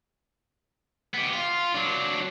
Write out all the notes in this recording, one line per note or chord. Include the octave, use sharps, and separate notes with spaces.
B3 G4
F4
F#3 D4